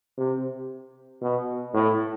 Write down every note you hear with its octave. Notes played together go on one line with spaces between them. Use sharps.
C3
B2
A2